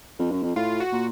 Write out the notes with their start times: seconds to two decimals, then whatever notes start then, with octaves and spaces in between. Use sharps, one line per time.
0.19 F2
0.31 F#2
0.43 F2
0.56 A2 F4
0.80 F#4
0.93 A#2